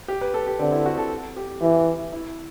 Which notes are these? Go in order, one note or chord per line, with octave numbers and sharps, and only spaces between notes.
G4
B4
A4
G4
D3 C4
E4
F#4
A4
G4
E3 G4
E4